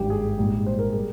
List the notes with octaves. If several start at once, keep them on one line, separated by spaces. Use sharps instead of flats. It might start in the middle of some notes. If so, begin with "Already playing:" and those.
Already playing: G#1 G2 G3 G4
G#4
A#1 G#2 G3
C5
A#4
G3 G#4